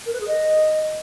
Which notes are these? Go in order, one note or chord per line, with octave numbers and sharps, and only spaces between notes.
A#4
B4
G#4
D#5